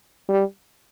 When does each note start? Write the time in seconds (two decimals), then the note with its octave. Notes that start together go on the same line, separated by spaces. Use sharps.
0.29 G3